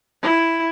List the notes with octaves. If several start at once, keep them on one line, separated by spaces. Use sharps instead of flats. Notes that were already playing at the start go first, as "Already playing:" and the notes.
E4